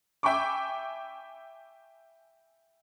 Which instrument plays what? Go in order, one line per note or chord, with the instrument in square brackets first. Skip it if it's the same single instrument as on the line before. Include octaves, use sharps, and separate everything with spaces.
[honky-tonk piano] E5 G5 G#5 B5 C#6 D6